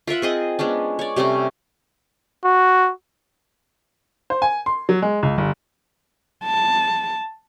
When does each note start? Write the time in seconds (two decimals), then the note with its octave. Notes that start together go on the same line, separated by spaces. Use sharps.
0.07 F4 A#4 E5 F#5
0.22 C4 G#4 D#5
0.59 G#3 B3 C#4 D4
0.99 C#5 D5
1.16 C3 G3 A3 C#4
2.45 F#4
4.30 C5
4.42 G#5
4.66 C6
4.89 F#3
5.02 G#3
5.23 C#2
5.38 G1
6.45 A5